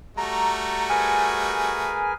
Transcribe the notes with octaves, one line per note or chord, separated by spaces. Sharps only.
G3 A3 F#4 A#5
G#4 A#4 B4 G#5